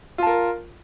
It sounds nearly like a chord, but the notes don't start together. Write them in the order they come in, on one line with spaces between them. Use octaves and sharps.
F4 A5 A#4